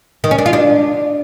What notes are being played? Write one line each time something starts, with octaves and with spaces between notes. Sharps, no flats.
D#3
C#4
D4
F4
D4